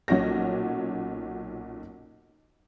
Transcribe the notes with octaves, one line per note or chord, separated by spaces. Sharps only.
B1 A#2 C#4 F#4 A#6